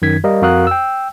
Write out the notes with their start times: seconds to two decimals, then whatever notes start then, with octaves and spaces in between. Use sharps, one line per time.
0.02 F#2 D#3 G#6 B6
0.24 G3 A#4 D#5 F5
0.42 F2 F#4 A#4 F5 D#6 F#6
0.67 G5 E6